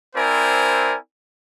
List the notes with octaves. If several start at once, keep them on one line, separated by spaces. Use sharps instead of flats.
C4 E4 A#4 C5 D5 G#5